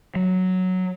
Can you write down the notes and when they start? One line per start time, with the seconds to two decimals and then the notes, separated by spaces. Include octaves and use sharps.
0.15 F#3